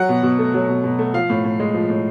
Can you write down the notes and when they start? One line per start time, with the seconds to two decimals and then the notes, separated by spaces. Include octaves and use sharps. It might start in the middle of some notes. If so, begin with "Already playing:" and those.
Already playing: F#3 F#5
0.09 B2
0.23 B2
0.39 A3
0.54 F#3
0.69 B2
0.84 B2
0.99 A3
1.14 F3 F5
1.30 A2
1.44 A2
1.60 G#3
1.74 F3
1.90 A2